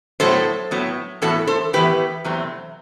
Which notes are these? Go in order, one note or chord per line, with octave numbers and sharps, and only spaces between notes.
A2 F#3 B3 A4 C5
A2 F#3 B3
A2 E3 B3 F#4 A4
A4 C5
A2 E3 B3 G4 B4
E2 C3 F#3 A3 C4